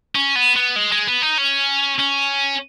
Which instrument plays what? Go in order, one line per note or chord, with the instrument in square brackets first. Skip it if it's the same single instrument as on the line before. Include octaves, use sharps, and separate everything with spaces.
[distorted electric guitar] C#4
B3
B3
G#3
G#3
B3
D#4
C#4
C#4